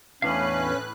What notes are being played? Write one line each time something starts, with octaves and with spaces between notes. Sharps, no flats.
E2 A2 C#4 D4 B4 F5 F#6